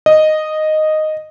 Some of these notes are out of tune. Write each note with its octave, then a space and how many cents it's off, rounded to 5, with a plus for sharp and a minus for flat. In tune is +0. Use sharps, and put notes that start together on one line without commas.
D#5 -5